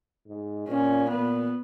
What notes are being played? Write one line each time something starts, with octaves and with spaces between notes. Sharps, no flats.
G#2
A#2 C#4
A#2 B3